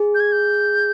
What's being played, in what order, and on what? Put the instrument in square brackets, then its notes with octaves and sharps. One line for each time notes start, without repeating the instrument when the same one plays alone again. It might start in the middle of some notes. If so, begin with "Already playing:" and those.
Already playing: [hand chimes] G#4
[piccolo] G6
G#6
G6